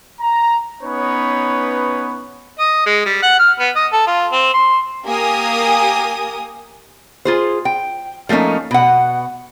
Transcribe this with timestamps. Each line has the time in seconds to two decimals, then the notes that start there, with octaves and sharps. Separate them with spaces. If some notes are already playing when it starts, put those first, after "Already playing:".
0.21 A#5
0.83 B3 C#4 D#4 B4 C#5
2.59 D#5
2.86 G#3
3.06 G3
3.22 F#5
3.39 F6
3.59 B3
3.75 D#5
3.92 A4
4.07 F4
4.32 C4
4.54 C6
5.06 A#3 G4 A#4 G#5 D#6
7.25 F4 G#4 C5
7.65 G5
8.29 F3 A3 A#3 C#4 D#4
8.71 B2 F#5